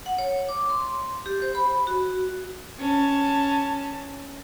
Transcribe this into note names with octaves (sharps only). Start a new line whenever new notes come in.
F#5
C#5
D6
C6
G4
C5
B5
F#4
C#4 A5